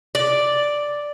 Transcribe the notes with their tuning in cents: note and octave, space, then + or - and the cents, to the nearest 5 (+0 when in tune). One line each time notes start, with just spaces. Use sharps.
D5 +0